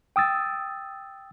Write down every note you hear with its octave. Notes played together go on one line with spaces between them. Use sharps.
G5 D#6 E6 A6